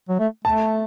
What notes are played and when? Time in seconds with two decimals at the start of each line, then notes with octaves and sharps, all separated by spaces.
0.09 F#3
0.19 A3
0.44 A3 A5